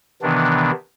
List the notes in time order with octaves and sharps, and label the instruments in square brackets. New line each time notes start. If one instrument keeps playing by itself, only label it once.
[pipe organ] C3 D#3 E3 B3 D4